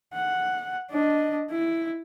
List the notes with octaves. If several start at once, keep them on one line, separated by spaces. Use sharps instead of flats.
F#5
D4 D#5
E4